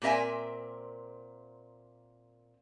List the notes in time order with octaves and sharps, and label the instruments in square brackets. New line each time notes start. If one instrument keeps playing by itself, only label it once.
[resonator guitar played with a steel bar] A#2 C4 A#4 E5 G#5